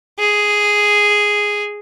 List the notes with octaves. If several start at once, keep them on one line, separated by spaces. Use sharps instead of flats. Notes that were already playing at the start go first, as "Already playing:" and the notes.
G#4